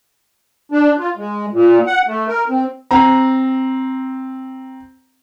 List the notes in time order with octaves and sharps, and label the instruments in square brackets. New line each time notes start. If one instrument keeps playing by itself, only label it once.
[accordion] D4
F4
G#3
A#2
F#5
A3
A#4
C4
[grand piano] C4 A#5